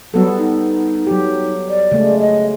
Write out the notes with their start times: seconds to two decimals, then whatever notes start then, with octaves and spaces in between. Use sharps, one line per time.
0.14 F#3 G3 B3 A4
0.38 D#4
1.07 F#3 G4
1.69 D5
1.92 C#3 G#3 A3
2.20 D#5